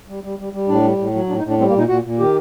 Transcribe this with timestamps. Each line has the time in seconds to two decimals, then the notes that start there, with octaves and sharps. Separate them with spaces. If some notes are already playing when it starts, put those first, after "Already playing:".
0.08 G3
0.23 G3
0.39 G3
0.53 G3
0.68 A2 D4
0.83 G3
0.98 A2
1.14 F#3
1.29 A2 D4
1.39 D#4
1.44 A2
1.49 D4
1.59 G3 C4
1.69 A#3
1.74 A#2 D#4
1.88 A#2 F#4
2.04 A#2
2.19 D#3 G4